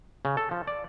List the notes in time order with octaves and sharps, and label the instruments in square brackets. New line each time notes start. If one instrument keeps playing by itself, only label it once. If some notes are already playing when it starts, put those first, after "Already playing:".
[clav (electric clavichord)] C#3
A4
F3
D5